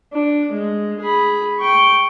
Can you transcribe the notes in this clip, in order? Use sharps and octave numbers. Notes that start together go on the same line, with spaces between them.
D4
G#3
G#4 B5
G5 C#6